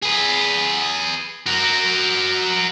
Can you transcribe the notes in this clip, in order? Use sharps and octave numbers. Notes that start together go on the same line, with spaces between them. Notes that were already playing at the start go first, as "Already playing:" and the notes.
G#4 B4
F#4 A#4